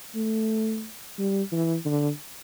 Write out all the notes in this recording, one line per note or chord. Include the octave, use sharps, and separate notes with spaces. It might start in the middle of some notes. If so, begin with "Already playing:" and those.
A3
G3
E3
D3